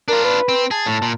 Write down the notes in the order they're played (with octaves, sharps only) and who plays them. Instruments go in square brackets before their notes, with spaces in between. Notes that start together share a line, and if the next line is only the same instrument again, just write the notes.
[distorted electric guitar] D4 F4 [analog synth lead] A#4
[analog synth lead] B4
[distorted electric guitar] C4
[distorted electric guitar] G#4 [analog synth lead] A5
[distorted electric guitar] A2
A#2